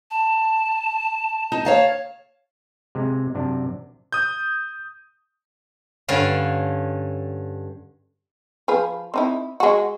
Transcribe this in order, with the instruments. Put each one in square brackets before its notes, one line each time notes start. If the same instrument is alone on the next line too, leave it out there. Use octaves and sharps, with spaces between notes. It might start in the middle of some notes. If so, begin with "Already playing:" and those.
[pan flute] A5
[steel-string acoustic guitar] D#4
C#5 F5 A5
[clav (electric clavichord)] C3 G#3
F#2 C3 D4
[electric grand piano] D#6 G6
[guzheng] G2 D3 C#4 F5
[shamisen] F3 G#4 B4
C4 D#4 E4
G#3 F#4